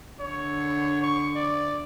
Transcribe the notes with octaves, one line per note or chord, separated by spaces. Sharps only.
D3 C#5
C#6
D5